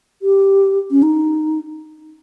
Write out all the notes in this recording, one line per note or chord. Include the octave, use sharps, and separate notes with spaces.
G4
C#4
D#4